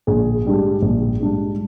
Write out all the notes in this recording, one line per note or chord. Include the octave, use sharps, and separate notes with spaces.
A#1 G#4
G#2 G3 D4
A#1
G#2 G3 D4